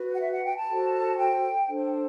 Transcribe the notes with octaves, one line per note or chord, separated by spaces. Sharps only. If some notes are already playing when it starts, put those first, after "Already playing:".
Already playing: F#4 B4
F#5
E5
F#5
G5
A5
F#4 A4 C5
G5
D4 A4 C5